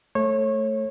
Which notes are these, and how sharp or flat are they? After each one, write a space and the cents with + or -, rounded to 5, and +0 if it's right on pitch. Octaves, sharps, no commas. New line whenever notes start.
A3 +0 C#5 -25